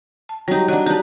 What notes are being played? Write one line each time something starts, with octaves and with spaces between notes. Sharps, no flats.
A5
F#3 G3 D#4 G4
F#3 D4 F#4 D#5 F#5
D#4 G4 B4 A5